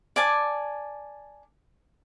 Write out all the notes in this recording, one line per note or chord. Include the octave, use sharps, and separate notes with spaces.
D5 G#5 A5